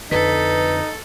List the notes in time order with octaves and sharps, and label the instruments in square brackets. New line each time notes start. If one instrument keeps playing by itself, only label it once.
[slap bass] F2 D3 [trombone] D#4 [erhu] A4 [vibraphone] B4